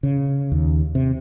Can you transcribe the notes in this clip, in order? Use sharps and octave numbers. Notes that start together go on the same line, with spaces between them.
C#3
D#2
C3